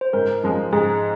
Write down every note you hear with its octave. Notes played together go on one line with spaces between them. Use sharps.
C5
G#2 A#4
F3 G#3
G#2 G#4